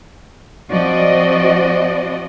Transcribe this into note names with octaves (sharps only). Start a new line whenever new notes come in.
F3 C4 F#4 D5 D#5